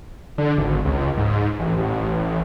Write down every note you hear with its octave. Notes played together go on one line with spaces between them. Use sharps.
D3
G#1
C#2
G#2
A1
A1